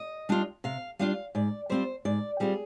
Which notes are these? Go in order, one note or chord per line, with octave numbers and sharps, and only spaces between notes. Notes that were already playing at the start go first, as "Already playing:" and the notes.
Already playing: D#5
G3 D4 F4
C3 F5
G3 D4 F4 F5
G#2 D5
G3 C4 F4 C5
G#2 D5
G3 C4 F4 G#4